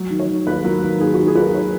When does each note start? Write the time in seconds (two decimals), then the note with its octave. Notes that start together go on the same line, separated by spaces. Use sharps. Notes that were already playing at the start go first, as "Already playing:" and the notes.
Already playing: F#3
0.10 D#3
0.19 C#5
0.29 D#3
0.47 D#2 B4
0.64 F#3 A#4
0.82 D#3 A#4
1.00 D#2 G#4
1.14 F#4
1.19 D#3
1.27 G#4
1.35 D#2 A#4 B4
1.55 C#5